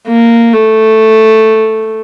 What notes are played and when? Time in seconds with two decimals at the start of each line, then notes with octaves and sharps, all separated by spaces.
0.08 A#3
0.53 A3